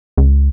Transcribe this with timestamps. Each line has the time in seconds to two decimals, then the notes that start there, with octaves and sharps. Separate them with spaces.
0.17 C#2